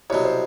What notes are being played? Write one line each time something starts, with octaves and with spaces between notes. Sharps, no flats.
C2 B2 F#3 C#5
C5